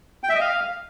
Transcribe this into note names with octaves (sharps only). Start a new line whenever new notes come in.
G5
E5
D#5
F5